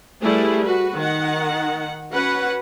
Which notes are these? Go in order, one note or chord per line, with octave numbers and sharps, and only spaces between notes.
G3 A3 E4 G#4 B4
F#4 B4
D#3 F#5
C#4 F#4 B4 F#5